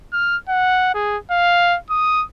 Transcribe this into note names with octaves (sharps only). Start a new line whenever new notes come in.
F6
F#5
G#4
F5
D#6